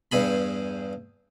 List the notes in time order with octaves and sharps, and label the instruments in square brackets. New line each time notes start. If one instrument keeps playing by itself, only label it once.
[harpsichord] E2 G2 G#4 B5